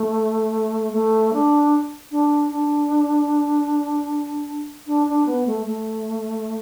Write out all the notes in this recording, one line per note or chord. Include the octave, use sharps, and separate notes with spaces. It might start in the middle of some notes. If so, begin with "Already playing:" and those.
Already playing: A3
A3
D4
D4
D4
D4
D4
B3
A3
A3